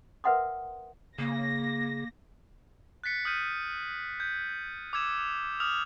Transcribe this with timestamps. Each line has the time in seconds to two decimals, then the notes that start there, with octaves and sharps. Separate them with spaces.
0.24 A#4 B4 E5 F#5 C6 D#6
1.19 C#3 A#3 A#6
3.04 F#6 A6 B6 C#7
3.25 D#6 F6 G6 D#7
4.20 G6 G#6
4.93 D6 E6 G#6 E7
5.60 D6 D#6 F6 F7